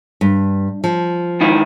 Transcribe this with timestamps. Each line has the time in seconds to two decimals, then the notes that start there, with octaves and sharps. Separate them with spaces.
0.21 G2
0.84 F3
1.41 G#2 D#3 E4